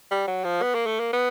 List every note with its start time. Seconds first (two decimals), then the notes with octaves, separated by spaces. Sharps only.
0.11 G3
0.27 F#3
0.44 F3
0.62 B3
0.74 A#3
0.86 A3
1.00 A#3
1.13 B3